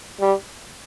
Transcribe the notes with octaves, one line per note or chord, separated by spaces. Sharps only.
G3